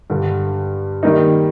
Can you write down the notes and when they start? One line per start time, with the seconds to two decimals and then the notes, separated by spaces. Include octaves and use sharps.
0.10 G2 D3 G3
1.03 D#3 G3 A#3 D#4